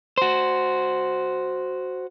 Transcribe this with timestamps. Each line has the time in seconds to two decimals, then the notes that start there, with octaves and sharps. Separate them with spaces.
0.18 F#4 C5